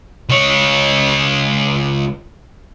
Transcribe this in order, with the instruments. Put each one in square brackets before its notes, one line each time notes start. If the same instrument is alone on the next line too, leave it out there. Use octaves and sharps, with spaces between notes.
[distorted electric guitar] C#2 C#5